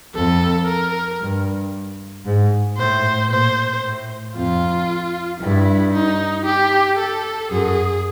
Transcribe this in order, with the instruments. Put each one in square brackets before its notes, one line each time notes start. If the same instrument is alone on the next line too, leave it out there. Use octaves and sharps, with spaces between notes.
[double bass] F2 [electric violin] A4
[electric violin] A#4
[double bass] G2
G#2
[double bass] A2 [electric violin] C5
[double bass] A#2 [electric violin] C5
[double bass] A2
[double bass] F2 [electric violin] F4
[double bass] G2 [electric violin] E4
[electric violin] D#4
G4
A4
[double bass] F#2 [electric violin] G#4